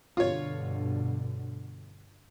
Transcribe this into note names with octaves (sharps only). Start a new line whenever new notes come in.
G2 B2 D3 F4 C#5